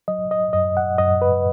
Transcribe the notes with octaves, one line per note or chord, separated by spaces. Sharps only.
F#3 D#5
D#5
F#2 D#5
F#5
F#2 D#5
B4